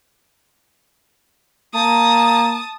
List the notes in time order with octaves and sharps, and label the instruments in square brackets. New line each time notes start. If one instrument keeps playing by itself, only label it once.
[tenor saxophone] A#3 [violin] A5 D#6